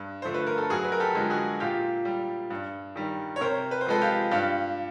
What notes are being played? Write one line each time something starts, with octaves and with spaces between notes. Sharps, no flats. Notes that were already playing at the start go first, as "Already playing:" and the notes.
Already playing: G2
D3 F3 A3 C5
B4
A#4
A4
F#2 F#4 G#4
B4
A#4
G4 A4
D3 F3 G#3
F#4 G#4
A#2 F4 G4
G3
G2
D#3 G3
C#5
C3 A#4 C5
B4
C5
F3 G#3 A4 B4
F4 G4
G2 F4 G4